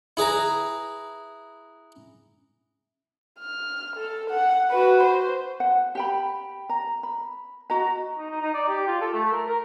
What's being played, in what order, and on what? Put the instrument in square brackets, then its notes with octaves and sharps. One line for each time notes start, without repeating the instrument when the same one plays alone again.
[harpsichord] E4 G#4 B4 A#5
[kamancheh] F6
A4
F#5
F#4 B4
C5
[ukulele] F#5
G4 G5 B5
A#5
B5
F#4 D#5 A#5
[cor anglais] D#4
D#4
D#4
D5
G4
F4
A4
A3
A#4
A#4